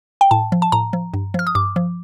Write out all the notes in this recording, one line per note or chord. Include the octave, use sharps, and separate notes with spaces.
G5
A2 A5
F3
A5
A2 A#5
F3
G2
F3 F6
D#6
G2 D6
F3